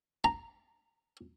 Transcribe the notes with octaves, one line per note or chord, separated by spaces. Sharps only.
A#5